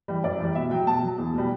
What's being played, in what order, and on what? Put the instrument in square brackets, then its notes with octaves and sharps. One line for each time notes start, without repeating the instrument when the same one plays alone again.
[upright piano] E3 G3
F#2 D5
E3 G3
B2 E5
F#3 G5
B2 A5
F#3
E2
B2 G3